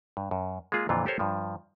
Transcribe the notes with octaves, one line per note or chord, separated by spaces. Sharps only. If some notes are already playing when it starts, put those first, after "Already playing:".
G2
F#2
G#3 A#3 F4 G#4
F2 A#2 D3 E3 F4
G4 A4 A#4 C5 C#5
G2 F3